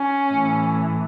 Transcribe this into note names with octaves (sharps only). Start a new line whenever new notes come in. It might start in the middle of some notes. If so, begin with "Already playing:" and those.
Already playing: C#4
A2 E3